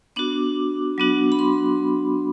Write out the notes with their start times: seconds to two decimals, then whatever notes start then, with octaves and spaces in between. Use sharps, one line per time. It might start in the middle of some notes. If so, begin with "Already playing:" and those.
0.16 B3 D4 F#4 D6
0.98 F#3 B3 D4 F#4
1.32 B5
1.39 C6